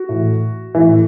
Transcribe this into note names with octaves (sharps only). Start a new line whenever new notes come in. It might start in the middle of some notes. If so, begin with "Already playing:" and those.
Already playing: F#4
A2 E3
A2 E3